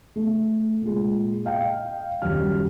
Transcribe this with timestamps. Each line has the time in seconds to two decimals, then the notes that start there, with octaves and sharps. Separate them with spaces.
0.16 A3
0.81 A#2 G#3
1.45 D#5 F5 G5
2.22 D#1 F#2 F#3 G3 F6